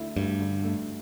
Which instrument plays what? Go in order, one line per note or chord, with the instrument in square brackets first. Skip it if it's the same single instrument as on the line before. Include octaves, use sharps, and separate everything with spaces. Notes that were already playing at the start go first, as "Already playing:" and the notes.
Already playing: [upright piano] D2 D3 A3 E4
[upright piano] D2 [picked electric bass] G2
[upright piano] D3
A3